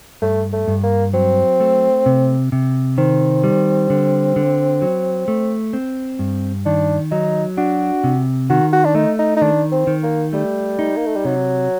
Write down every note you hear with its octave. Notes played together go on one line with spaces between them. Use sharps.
G2 A3
A3
G2
A#3
F#3 C4
A3
C3
C3
D#3 C4
G3
D3
D3
F#3
A3
C4
G2
D#3 D4
F#3 D#4
D4 F#4
C3
D#3 F#4
F#4
D4
A3 D#4
D#4
D#4
D#3 D4
C4
D#3
A#3
G3 A3
D#4
A#3
A3
G3
C3 F#3